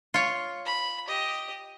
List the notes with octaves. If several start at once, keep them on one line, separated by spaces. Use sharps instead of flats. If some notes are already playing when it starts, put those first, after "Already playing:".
F4 C#5
B5
G4 D#5